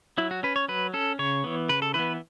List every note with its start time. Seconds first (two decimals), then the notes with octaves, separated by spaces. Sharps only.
0.18 F#3 E4
0.31 F#4
0.43 C#4 B4
0.56 C#5
0.68 F#3 B4
0.94 C#4 A4
1.19 C#3 C#5
1.44 E3 B3
1.69 C#3 B4
1.82 A4
1.94 E3 B3 B4